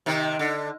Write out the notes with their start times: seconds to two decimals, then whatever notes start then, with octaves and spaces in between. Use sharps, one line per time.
0.06 C3 D#3
0.39 D3